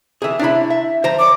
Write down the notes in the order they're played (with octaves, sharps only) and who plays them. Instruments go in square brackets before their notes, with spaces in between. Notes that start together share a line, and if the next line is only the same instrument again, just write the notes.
[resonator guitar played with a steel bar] C3 E3 [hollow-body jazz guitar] G#4 E5
[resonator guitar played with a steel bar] C3 C#5 E5 [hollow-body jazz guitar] D4 E4 B5
[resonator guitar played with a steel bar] E5
[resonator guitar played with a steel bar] F3 [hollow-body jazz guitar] C5 A#5
[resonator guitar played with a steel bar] F3 C#5 D5 [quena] D6